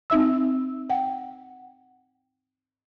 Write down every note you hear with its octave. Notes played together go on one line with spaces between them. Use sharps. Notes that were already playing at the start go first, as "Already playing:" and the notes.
C4 D#4 E5 E6
F#5 G5